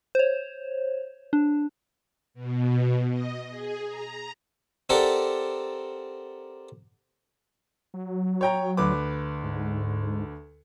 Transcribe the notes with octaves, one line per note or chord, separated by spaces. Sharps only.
C5 C#5
D4
B2
D#5
G#4
A#5
C4 G4 A4 A#4 D5 F#5
F#3
C#5 G5 A#5
D2 B4 D6
G#2